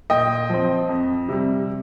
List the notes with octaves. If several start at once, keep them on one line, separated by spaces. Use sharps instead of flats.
A#2 D#5 G5
F3 C4
F2
C3 G3